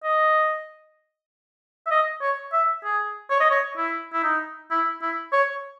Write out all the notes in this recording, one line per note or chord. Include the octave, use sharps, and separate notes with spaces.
D#5
E5
D#5
C#5
E5
G#4
C#5
D#5
C#5
E4
E4
D#4
E4
E4
C#5